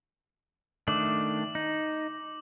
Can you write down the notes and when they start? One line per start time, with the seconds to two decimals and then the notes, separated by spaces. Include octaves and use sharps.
0.88 D#3 A3 D4 D6 F#7
1.55 D#4